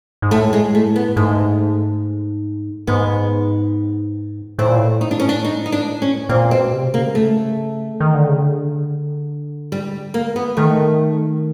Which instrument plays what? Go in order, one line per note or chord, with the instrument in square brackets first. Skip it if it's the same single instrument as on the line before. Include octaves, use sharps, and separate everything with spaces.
[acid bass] G#2
[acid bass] A2 [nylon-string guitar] A3
[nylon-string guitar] G#3
A3
B3
[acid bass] G#2 [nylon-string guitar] A3
[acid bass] G#2 [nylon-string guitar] B3
[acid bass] A2 [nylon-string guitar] C4
[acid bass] A#2
A2
[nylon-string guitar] D#4
D4
C#4
D4
D#4
D#4
D4
C#4
[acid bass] A#2 [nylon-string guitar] C4
[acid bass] B2 [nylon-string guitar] C4
[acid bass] C3
[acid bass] C#3 [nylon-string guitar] A#3
[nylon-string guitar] A3
[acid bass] D#3
D3
C#3
D3
[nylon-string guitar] G3
A#3
B3
[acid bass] D#3 [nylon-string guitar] A3